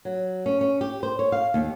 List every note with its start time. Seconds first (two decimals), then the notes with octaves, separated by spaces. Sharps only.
0.05 F#3
0.46 C#4
0.61 C#4
0.81 G4
1.03 C5
1.19 C#5
1.32 F5
1.54 D#2